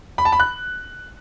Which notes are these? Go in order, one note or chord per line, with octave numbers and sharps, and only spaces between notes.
B5
A5
B5
F#6